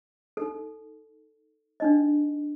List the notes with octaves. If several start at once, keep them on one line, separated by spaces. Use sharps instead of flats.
D#4 A4
D4 D#4 D#5